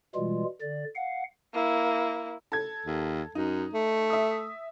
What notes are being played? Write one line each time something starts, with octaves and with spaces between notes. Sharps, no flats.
B2 E3 G3 G#3 F4
D3 D5
F5 F#5
A#3 E4
A4 G#6
D#2
F#2 D#4
A3
E5 D#6